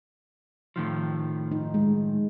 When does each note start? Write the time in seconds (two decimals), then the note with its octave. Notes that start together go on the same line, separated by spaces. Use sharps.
0.76 A2 D#3 F3
1.52 D#4
1.74 G#3